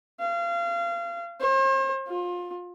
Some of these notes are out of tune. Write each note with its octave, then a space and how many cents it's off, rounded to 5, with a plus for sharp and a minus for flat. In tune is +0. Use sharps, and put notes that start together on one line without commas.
F5 -30
C5 +40
F4 +25